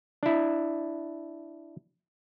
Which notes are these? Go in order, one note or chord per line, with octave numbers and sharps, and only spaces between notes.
D4 E4